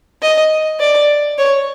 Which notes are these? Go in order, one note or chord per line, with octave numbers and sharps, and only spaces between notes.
D#5
D5
C#5